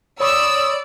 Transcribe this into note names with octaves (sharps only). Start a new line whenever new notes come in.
C#5 D5 B5 C#6 D#6 E6